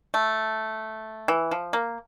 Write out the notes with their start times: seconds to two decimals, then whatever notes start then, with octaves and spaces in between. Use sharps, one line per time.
0.14 A3
1.28 E3
1.51 F3
1.73 A#3